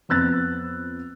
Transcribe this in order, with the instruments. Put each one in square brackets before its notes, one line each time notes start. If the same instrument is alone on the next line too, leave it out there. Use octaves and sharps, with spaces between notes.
[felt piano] F2 B3 E6 F#6 A6